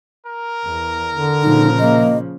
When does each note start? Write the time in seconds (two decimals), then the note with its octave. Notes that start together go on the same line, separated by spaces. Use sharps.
0.26 A#4
0.65 E2
1.12 D3
1.43 A#2 C#3 F3 D#4
1.79 A#3 D#5